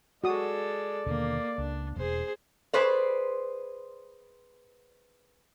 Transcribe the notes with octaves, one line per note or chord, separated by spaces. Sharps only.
G#3 F#4 A4 D5 D#6
D#2 B2 D3 A#3
C#2 D4
E1 G#4 C5
G#4 B4 C5 D5